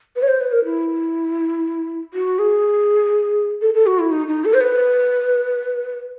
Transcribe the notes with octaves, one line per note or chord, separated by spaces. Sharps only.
B4
C#5
C5
B4
A#4
E4
F#4
G#4
A4
A4
F#4
E4
D#4
D#4
A4
C5
B4